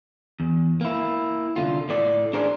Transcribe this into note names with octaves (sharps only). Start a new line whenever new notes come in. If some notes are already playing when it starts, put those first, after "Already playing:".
E2
A#3 E4
C2 F2 D3 F4
A2 A3 D5
D4 G#4 A#4 C5 D5